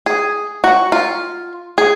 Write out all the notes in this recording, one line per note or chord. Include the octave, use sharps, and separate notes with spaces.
G#4
F#4
F4
G#4